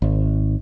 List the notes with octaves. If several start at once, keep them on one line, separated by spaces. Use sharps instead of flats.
G#1